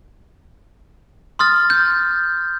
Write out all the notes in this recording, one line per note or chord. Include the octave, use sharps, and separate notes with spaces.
C6 D#6 F6 A6
G6